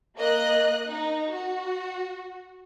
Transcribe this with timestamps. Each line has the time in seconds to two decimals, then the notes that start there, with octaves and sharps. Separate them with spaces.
0.17 A#3 D#5 F#6
0.88 D#4
1.31 F#4